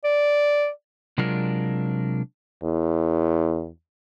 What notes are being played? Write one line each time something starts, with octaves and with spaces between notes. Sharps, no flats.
D5
C3 F#3 G#3 D4 F4 A#4
E2